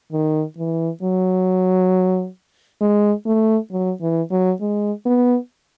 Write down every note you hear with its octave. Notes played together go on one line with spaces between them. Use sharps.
D#3
E3
F#3
G#3
A3
F#3
E3
F#3
G#3
B3